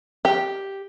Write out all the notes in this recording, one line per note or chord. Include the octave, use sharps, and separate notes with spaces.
G4